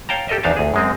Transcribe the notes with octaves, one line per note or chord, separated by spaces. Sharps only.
C#5 F5 G5 A5 A#5
G4 A4 A#4 D#5 E5
E2 D4 D#4 C5 F5 A5
D2 G#4
F#2 G#3 C4